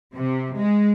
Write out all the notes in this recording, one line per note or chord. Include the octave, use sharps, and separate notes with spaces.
C3
G#3